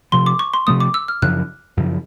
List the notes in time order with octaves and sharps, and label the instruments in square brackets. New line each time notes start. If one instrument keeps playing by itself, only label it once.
[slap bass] C3 F3 A3 [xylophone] C6
[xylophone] D6
C#6
C6
[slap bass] C3 F3 A3 [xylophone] D#6
[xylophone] D6
E6
F6
[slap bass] F#2 C#3 F3 [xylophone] F#6
[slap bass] F#2 C#3 F3